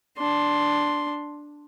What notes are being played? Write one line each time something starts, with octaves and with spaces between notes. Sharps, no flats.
D4 C6